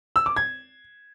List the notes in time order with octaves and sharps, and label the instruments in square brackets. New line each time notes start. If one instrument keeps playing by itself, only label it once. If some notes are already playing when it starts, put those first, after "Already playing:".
[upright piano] E6
D6
G#6